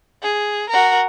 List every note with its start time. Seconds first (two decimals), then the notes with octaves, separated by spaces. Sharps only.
0.22 G#4
0.69 F#4 A#4